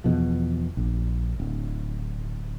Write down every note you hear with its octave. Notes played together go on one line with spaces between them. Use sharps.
E2 B2 F3
A#1
D1